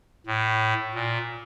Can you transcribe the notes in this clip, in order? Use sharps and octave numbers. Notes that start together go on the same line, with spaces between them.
A2
A#2